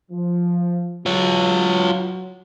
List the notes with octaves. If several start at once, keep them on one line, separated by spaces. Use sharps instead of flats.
F3
F#3 F4 C#5